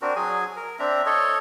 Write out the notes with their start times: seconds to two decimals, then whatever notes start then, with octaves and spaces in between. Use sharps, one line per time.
0.02 C4 D4 F#4 A#4
0.16 F#3 G#4 G#5
0.56 A#4
0.79 C4 D4 E5 A#5
1.06 A4 C#5 D#5